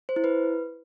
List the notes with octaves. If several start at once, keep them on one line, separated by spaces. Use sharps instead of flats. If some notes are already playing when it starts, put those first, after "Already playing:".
C5
E4
B4